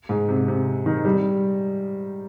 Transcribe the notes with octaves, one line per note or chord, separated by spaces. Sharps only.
G#2
C3
C3
D#3
G3